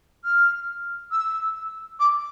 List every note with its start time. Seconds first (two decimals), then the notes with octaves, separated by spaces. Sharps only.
0.24 F6
1.11 E6
1.99 D6